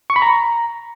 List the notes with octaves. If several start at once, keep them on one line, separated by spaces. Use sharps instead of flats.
C#6
B5
A#5